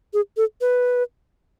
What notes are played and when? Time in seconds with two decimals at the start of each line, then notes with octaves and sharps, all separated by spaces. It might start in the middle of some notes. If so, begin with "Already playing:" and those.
0.14 G#4
0.37 A4
0.61 B4